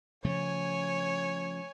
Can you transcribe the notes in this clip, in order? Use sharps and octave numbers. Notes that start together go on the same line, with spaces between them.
C#3 F3 A3 C#5 G#5